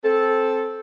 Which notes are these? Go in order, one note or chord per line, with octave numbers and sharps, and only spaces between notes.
C4 A4